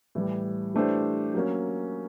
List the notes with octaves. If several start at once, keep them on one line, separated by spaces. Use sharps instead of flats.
A2 E3 G3
E3 A3 D4 G4 C5
F#3 A#3 C#4